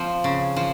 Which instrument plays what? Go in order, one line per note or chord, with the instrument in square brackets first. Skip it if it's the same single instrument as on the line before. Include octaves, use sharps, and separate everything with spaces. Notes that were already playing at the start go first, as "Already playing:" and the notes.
Already playing: [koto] F3 C4
C#3
F3